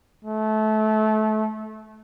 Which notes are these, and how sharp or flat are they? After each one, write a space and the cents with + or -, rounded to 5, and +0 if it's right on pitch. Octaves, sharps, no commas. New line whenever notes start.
A3 -25